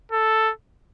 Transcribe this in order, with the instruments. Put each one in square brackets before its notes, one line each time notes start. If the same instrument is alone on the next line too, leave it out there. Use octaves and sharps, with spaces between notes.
[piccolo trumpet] A4